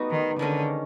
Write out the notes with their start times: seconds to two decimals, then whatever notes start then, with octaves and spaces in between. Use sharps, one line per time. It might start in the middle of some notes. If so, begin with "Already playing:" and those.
Already playing: G3 A3 B3 D#4 F#4
0.10 D#3
0.39 D3 D#3 G#3 C#4